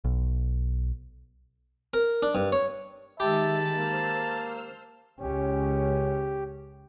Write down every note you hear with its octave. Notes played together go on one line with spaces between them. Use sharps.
B1
A#4
D4
G2
C#5
D#3 G#3 G4 E5 A5 B5 A6
A#3 C5 E6 F6
C#2 C#4 G4